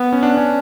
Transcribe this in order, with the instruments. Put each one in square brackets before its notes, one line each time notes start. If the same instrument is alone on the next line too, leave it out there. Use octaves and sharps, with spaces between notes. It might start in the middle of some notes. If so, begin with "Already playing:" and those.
Already playing: [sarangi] B3
[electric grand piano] C#4
D4
C#4